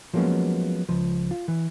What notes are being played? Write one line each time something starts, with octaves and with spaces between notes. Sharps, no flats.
F3 F#3 G#3 A#3 B3 C#4
C#2 F3
F4
E3